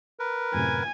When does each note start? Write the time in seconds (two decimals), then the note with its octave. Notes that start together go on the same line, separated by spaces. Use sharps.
0.19 A#4 B4
0.54 F#2 A2 C3 G#5